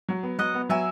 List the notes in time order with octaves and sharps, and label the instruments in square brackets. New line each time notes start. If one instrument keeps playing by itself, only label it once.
[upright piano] F#3
B3
[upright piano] F#3 [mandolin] D#5 F#5
[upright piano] B3
[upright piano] F#3 [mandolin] E5 G#5